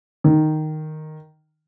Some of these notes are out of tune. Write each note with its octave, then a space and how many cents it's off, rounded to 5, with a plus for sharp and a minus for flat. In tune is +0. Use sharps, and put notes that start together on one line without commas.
D#3 -5